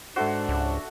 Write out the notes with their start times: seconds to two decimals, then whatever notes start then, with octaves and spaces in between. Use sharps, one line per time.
0.16 G#2 D4 F#4 A4 C5 E5
0.49 C#2